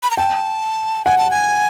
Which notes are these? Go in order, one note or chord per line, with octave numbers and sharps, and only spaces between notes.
B5
A#5
G5 A5
F#5 G#5
A5
G#5